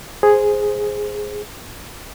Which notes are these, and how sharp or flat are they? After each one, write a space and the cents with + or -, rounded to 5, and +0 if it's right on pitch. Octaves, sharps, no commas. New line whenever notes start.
G#4 +0 C5 +0